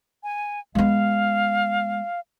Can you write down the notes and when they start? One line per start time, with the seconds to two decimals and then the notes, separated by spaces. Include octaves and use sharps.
0.23 G#5
0.75 G#3 B3 F5